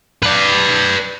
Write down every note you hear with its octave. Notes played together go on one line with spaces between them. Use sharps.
B4 D5